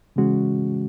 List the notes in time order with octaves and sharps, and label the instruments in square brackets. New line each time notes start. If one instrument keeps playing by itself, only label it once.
[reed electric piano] C#3 E3 G#3 C#4 F#4